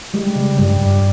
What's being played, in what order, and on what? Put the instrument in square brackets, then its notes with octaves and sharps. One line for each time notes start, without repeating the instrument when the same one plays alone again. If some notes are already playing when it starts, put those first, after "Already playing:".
[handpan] G3 [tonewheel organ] G#3
[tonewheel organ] C#3
[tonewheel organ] G2 [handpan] G3
[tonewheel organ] G2